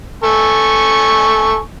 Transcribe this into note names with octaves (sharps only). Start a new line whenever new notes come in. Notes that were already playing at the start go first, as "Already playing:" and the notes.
A4 G#5 C#6